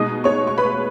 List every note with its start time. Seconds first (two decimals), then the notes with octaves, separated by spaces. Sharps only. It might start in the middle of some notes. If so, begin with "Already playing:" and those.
Already playing: B2 G#3 D#4 D#5 D#6
0.24 C#5 C#6
0.47 C#6
0.58 B4 B5